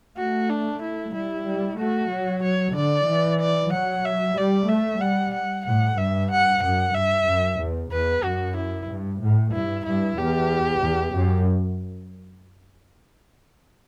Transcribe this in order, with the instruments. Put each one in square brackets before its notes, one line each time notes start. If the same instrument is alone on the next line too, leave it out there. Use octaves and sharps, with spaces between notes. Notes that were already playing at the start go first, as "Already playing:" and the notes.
[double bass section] A3 [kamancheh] F#4
[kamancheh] D4
E4
[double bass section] G3 [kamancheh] E4
[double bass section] G3
[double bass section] A3 [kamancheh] F#4
[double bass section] F#3
[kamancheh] C#5
[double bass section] D3 [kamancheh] D5
[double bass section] E3
[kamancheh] D5
[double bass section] F#3 [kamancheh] F#5
[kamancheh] E5
[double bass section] G3 [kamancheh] D5
[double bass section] A3 [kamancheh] E5
[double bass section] G3 [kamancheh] F#5
[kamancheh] F#5
[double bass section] A2 [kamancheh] F#5
[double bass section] G2 [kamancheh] E5
[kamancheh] F#5
[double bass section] F#2 [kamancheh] F#5
[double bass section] G2 [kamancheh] E5
[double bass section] F#2
E2
[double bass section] E2 [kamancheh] B4
[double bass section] F#2 [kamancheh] F#4
[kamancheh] E4
[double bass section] G2
A2
[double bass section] G2 [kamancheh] E4
[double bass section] G2 [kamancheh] E4
[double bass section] E2 [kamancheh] G4
[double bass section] E2
F#2